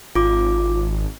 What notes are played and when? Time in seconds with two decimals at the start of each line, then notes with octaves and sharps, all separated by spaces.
0.15 G#1 F4 D6